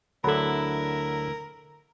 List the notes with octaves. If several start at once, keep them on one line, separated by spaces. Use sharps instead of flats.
D2 D3 F#3 E4 A4 A#4 B5